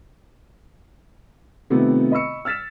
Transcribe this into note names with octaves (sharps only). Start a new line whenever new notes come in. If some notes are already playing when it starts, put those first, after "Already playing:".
C3 D#3 A3 B3 C4 F4
D#5 B5 C#6 E6 C#7
E6 F6 A6 B6 E7